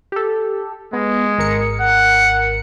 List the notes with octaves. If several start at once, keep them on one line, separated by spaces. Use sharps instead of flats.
G4 A4
G#3 B3
G#1 A#4 C#7
F#5